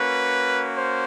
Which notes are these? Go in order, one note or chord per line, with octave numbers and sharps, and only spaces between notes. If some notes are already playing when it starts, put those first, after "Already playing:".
Already playing: A#3 C#4 F#4 B4
C5